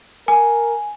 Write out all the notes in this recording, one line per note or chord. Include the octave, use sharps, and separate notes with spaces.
A#4 G#5